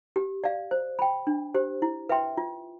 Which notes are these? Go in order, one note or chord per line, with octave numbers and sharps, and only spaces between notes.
G4
D5 F5
C5
G5 B5
D4
G4 C5
E4
B4 E5 G5 C6
F4